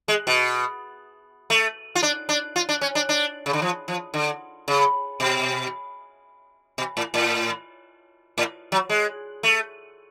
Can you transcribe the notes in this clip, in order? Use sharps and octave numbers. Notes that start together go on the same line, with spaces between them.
G#3
B2
A3
F4
D4
D4
F4
D4
C#4
D4
D4
C#3
D3
F3
F3
D3
C#3
B2
B2
A2
A2
A2
F#3
G#3
A3